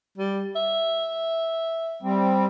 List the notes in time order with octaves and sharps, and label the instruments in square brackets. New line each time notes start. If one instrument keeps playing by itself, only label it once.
[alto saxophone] G3
E5
[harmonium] G3 C4